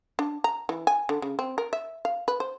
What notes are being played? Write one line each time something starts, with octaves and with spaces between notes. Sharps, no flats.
D4
A#5
E3
G#5
D3
C#3
C4
A#4
E5
F5
B4
C5